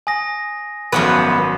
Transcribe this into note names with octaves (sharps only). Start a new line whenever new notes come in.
G#5 D#6 A#6
G#1 F#2 F3 B3 B4